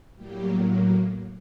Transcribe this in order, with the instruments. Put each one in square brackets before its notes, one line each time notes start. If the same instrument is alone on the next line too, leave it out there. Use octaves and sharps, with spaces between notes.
[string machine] A2 F#3 G3 A#3 G4